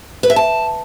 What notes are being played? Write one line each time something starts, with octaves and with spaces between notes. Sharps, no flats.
B4
E5
A5